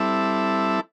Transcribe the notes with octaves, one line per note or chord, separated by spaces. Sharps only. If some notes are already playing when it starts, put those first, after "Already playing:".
Already playing: G3 C4 E4 A4 E5